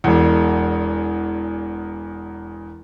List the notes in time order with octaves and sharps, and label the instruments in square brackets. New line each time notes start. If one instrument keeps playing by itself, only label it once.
[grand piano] E1 E2